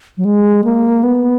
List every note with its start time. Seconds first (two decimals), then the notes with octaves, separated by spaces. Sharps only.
0.17 F#3
0.25 G#3
0.64 A#3
1.03 B3